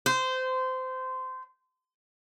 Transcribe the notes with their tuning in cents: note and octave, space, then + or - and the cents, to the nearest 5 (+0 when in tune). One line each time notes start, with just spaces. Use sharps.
C5 -20